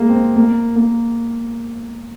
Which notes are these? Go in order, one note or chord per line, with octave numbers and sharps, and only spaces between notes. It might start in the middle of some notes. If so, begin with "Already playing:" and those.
Already playing: G#3 A#3
C4
A#3
A#3